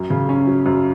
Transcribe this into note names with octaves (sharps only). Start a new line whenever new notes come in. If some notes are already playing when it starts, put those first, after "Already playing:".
Already playing: F#2
C#3
C#4
F#3
F#2